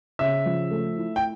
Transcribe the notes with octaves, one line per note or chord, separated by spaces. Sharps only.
C#3 E5
F3
A3
E4
G5